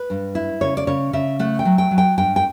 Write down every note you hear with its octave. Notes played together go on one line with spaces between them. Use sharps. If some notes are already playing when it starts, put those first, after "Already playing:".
Already playing: B4
G2
E4
C#3 C#5
D5
C#3 C#5
C#3 E5
A3 F#5
G5
F#3
G5
F#3
G5
G2 G5
G5